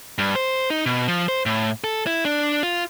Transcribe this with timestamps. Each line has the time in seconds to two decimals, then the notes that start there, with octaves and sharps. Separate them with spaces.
0.18 G2
0.35 C5
0.70 D#4
0.86 B2
1.08 F3
1.28 C5
1.46 A2
1.84 A4
2.07 E4
2.25 D4
2.63 F4